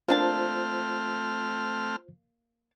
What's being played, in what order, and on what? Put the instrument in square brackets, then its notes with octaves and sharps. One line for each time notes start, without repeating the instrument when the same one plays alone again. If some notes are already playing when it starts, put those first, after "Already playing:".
[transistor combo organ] A3 C4 F6 [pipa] A#3 D4 A5 [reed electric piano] F4 C5